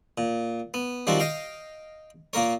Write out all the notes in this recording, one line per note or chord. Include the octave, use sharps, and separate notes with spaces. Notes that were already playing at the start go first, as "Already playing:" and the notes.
A#2
B3
D#3 F3 G3 C4 F#4
D#5 F5 G5
A#2 A#3 A#4 C#5